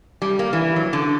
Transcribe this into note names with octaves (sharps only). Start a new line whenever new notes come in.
G3
A#3
E3
F#3
D3